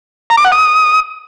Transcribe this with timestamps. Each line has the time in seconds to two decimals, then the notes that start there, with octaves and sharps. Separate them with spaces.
0.30 A#5
0.37 D6
0.45 F#5
0.52 D#6